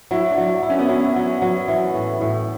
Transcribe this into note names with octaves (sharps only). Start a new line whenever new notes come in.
F#3 E4
D4
F#3
E4
C#4
B3
F#3 C#4
F#3
F#3
E3
A2
A2